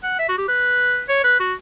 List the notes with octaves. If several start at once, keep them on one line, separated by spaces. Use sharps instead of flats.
F#5
E5
F#4
G4
B4
C#5
B4
F#4